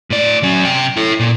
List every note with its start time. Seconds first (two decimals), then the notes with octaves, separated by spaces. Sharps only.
0.10 A2 D5
0.43 F#3 C#4
0.65 C3 G5
0.97 E4 A4
1.20 A#2